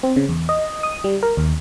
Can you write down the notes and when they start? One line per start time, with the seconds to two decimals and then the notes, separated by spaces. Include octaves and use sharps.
0.03 C4
0.16 C#3
0.29 E2
0.49 D#5
0.83 D#6
1.04 G3
1.23 A#4
1.37 D#2